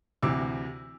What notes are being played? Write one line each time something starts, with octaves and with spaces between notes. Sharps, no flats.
D2 C3 E3 D6 E6